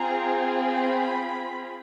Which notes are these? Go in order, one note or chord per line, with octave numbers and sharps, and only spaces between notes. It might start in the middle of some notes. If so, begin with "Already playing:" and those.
Already playing: C4 F4 G#4 A#5
B5